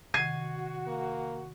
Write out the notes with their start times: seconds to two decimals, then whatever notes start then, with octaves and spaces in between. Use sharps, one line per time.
0.14 C3 D#3 F#4 G#6 C7 D#7
0.87 A#3